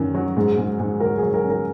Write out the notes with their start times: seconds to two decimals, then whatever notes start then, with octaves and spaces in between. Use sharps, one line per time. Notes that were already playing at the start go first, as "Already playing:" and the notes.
Already playing: F#2 D#3 C#4 A#4
0.15 F#3
0.37 G#2
0.58 G#2
0.79 G#2
1.00 F#3 A#4
1.17 G#4
1.23 F#3
1.34 A#4
1.44 C#4
1.50 A#4